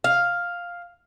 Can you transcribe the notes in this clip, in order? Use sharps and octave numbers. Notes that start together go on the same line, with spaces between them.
F5